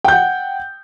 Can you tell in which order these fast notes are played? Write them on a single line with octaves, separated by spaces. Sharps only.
G5 G6 F#5